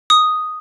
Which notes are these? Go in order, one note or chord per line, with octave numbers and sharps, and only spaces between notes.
D#6